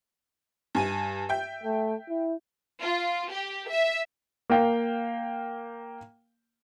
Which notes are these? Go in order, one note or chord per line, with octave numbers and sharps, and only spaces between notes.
G2 G#5 D#7
E5 G5 G6
A3
E4
F4
G4
E5
A#3 F5 G5